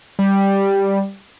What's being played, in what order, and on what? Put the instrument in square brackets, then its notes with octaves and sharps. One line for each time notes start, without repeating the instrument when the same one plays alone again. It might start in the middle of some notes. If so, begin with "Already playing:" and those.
[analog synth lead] G3